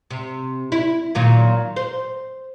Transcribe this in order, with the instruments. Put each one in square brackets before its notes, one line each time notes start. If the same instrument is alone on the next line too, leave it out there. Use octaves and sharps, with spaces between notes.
[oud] C3
E4
A#2 D#3 F#3
C5